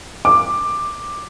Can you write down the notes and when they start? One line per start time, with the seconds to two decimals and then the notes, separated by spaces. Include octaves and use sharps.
0.25 D6